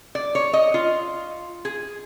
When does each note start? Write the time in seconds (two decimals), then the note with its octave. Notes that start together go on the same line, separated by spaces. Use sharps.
0.15 D5
0.35 C#5
0.53 D#5
0.74 F4
1.65 G#4